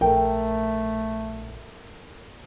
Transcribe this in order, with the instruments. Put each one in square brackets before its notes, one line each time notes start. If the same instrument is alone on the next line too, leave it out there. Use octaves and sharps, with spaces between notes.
[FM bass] A#1 [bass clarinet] A3 [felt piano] A4 A#4 [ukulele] G5